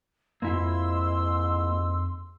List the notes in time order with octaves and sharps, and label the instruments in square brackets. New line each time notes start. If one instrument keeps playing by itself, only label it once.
[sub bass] F2 [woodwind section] G#2 E6 [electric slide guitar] A#3 E4 F4 [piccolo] C6